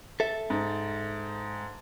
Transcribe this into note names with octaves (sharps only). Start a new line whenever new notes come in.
A4 E5
G#2